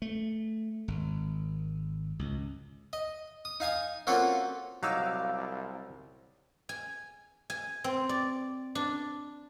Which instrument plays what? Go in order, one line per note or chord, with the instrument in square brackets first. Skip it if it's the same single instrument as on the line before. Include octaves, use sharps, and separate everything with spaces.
[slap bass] A3
G#1
C#2
[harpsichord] D#5
D#6
D#4 F5 G#5 D#6
A#3 C4 C#4 F4 F#4 A4
[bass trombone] C2 [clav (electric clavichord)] F#3 D#4 [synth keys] F5 D6 E6
[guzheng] G#5
G#5
C4
D5
D4